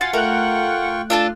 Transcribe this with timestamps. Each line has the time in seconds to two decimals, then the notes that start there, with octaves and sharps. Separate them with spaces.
0.01 F4 F5 F#5 G#5 C6 A6
0.13 A3 F4 A#4 G5 C#6 F#6
1.10 D4 F4 A4 A5